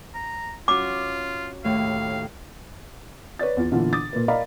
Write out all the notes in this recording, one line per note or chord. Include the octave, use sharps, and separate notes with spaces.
A#5
C#4 F4 F#4 D6
D#2 A2 F5
B4 C#5 D5 A6
E2 F4
A#2 D3 E3 B3 F4
D6 D#6 A6
A#2 A#3 B4
A#4 D5 D#5 F5 A#5 B5